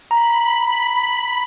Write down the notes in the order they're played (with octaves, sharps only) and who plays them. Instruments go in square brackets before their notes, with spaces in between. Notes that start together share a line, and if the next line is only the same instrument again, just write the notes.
[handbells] A#5 [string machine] B5